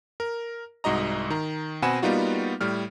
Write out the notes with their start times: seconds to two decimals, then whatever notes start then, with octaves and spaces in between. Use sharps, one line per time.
0.20 A#4
0.84 C2 G#2 F#4 D#5 A#5
1.30 D#3 A#5
1.82 B2 C4 F#5 G#5 B5 E7
2.02 G3 A#3 B3 D#4 F4 F#4
2.61 A2 G3 F6